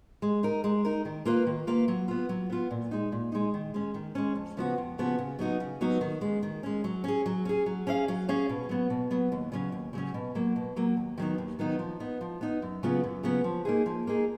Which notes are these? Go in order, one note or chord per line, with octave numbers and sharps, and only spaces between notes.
G#3
D#4 A#4
G#3
D#4 A#4
D#3
A#3 F4 B4 F5
D#3
A#3 F4 B4 F5
F#3
B3 F4
F#3
B3 F4
A#2
G#3 D#4
A#2
G#3 D#4
D#3
G#3 C#4
D#3
G#3 C#4
F2
C#3 F3 B3 F#4
F2
C#3 F3 B3 F#4
C#3
F#3 B3 D#4 F#4
C#3
F#3 B3 D#4 F#4
D#3
G#3 C#4
D#3
G#3 C#4
F#3
C#4 G#4
F#3
C#4 G#4
F#3
C#4 G#4 C#5 F5
F#3
C#4 G#4 C#5 F5
B2
F#3 B3
B2
F#3 B3
D#2
C#3 F#3 C#4
D#2
C#3 F#3 C#4
B2
F#3 A#3
B2
F#3 A#3
D#2
D#3 F#3 B3 D#4
D#2
D#3 F#3 B3 D#4
F3
B3 D#4
F3
B3 D#4
F#2
C#3 F#3 B3 F4
F#2
C#3 F#3 B3 F4
F3
A#3 D#4 G#4
F3
A#3 D#4 G#4